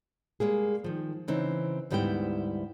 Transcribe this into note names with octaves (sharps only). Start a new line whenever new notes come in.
G3 G#3 A#3 G#4
D#3 F3
C#3 E3 C4 D#4
D2 G#2 G3 B3 E4 G5